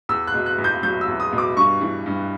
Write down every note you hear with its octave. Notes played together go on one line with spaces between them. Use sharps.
E2 E6
F#6
B2
F#6
E2
G6
F#3 G6
E6
E2
D#6
B2
D6
G2 C#6
E3
G2